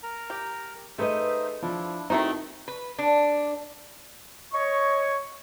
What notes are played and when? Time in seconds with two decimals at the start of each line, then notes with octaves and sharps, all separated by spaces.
0.03 A#4 A#5
0.30 G4
0.98 A3 D#4 G#4 B4 C5 D#5 E5
1.63 F3 D4 E4
2.10 D#3 A3 C4 D#4 E4 F#4 D#5 G5
2.68 B4
2.98 D4
4.53 C#5 D#5 C#6